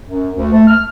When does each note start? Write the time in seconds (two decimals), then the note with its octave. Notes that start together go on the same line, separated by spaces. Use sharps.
0.06 F#2
0.35 D2
0.52 A3
0.67 F6